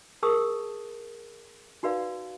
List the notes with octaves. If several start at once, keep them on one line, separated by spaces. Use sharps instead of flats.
G#4 A#4 A5 C#6 D#6 E6
D#4 F#4 B4 D5 F5